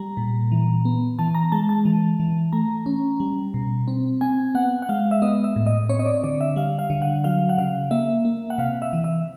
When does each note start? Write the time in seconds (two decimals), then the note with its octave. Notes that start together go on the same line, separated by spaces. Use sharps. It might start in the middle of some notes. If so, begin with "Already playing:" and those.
Already playing: G3 A#5
0.17 A#2
0.52 E3
0.85 B3
1.19 E3 A5
1.35 A#5
1.52 G#3 A5
1.69 A5
1.85 E3
2.20 E3
2.53 A3 A#5
2.86 C#4
3.20 G3
3.54 B2
3.88 C4
4.21 C4 G#5
4.55 B3 F#5
4.82 F#5
4.89 G#3 F5
5.11 E5
5.22 B3 D#5
5.44 E5
5.56 A2
5.66 D#5
5.89 C4 C#5
5.99 D#5
6.06 D5
6.24 D3 D5
6.41 E5
6.56 G3 F5
6.79 F5
6.90 D3
7.02 F#5
7.24 F#3 F5
7.49 F#5
7.58 C#3 F5
7.91 A#3 E5
8.25 A#3
8.50 F#5
8.58 C3 F5
8.82 E5
8.93 E3
9.04 E5